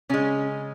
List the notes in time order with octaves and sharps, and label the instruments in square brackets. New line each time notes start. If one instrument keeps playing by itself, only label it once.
[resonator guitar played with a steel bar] C#3 G#3 C#4